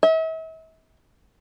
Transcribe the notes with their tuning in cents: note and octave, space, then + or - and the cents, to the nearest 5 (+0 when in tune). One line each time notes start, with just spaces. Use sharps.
E5 -40